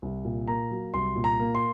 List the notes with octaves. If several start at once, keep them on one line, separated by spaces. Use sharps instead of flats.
C2
A#2
A#3 A#5
F#3
C2 C6
A#2
A#5
A#3
C6